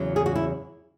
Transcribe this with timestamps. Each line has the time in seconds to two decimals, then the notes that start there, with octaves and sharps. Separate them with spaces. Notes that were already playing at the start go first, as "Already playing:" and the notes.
Already playing: E2 C#3 F#3
0.16 G#4
0.26 F#4
0.35 E4